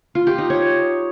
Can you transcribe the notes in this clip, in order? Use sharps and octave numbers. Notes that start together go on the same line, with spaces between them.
F4
G4
D#4
C#5